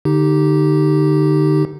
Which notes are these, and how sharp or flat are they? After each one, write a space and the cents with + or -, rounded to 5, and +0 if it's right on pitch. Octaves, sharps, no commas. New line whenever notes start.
D3 +20 D#4 +0 G4 -10